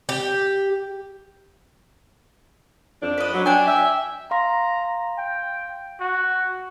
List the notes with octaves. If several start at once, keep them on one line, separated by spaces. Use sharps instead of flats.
G4
F2 D4
B4 D#5
F#3
D4 G5 G#5
E5
F5 A#5 C6
G5
F#4